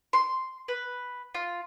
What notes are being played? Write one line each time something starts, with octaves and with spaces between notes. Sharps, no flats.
C6
B4
F4